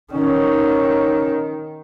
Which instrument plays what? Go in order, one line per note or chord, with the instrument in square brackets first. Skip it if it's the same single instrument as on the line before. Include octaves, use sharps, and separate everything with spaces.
[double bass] D#3 [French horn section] B3 D#4 C#5 [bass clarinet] C#4